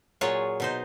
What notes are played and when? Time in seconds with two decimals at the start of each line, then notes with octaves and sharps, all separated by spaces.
0.21 A#2 F#3 F4 G#4 C#5
0.60 B2 D#4 C5